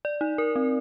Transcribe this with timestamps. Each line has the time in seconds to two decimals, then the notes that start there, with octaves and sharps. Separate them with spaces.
0.05 D5
0.21 D#4
0.38 A#4
0.56 C4